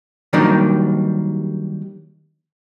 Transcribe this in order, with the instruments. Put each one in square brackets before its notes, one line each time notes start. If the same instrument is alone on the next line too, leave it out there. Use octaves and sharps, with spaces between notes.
[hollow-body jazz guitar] D#3 F#3 G3 A#3 D4 D#4